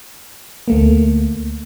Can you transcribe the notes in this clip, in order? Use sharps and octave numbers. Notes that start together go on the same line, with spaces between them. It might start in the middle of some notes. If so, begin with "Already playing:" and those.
D2 A3 A#3